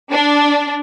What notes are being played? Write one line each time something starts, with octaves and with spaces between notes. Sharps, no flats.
D4